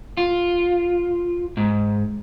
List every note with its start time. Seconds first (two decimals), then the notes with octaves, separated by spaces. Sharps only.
0.17 F4
1.57 G#2